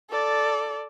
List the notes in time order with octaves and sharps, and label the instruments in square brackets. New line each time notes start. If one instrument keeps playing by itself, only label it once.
[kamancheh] A4 D5